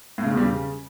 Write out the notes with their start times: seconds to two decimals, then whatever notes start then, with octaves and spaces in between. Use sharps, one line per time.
0.18 A2
0.25 C#3
0.31 E2
0.37 G3
0.44 C#3